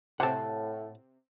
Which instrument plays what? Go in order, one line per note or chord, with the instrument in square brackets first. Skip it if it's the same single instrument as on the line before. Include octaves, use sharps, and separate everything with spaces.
[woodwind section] A2 [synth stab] C3 C4 [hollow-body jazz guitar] F#5 A5